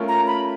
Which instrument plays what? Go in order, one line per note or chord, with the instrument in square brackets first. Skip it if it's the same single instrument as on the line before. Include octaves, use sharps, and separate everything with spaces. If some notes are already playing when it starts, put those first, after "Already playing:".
Already playing: [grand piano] A3 C#4 F4 A#4
[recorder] A#5
B5